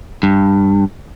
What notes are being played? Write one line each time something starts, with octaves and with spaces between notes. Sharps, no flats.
G2